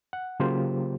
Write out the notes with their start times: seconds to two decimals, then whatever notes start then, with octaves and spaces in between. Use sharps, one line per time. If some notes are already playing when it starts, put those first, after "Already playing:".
0.13 F#5
0.40 C#3 F#3 A#3 F4 G4 C5